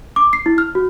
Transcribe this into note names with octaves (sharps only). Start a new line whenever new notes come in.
D6
C7
E4
F6
F#4